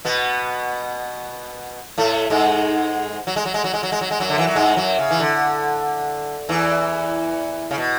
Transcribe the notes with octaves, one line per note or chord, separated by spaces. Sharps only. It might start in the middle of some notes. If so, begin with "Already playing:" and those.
B2 B3
A2 A3
G#2 G#3
F#3
G#3
F#3
G#3
F#3
G#3
F#3
G#3
F#3
G#3
F#2 F#3
D3
E3
F#3
G#2 G#3
F#2 F#3
C#3
E3
D3
E2 E3
C#3
B2